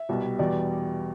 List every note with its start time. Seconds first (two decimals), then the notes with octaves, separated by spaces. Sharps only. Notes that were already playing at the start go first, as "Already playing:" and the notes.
Already playing: E5
0.09 C2 B2 G3
0.39 E2 B2 G3 D5